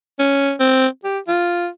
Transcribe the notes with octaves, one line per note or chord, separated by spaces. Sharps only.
C#4
C4
G4
F4